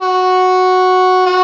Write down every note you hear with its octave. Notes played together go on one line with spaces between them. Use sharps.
F#4
F#4